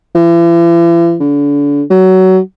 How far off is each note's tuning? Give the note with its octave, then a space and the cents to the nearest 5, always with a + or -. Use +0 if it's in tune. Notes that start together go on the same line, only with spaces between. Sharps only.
E3 +45
D3 -35
F#3 +20